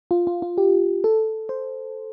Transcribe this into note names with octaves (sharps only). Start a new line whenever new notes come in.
F4
F4
F4
G4
A4
C5